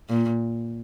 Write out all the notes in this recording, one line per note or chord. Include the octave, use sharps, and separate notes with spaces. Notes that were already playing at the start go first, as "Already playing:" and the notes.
A#2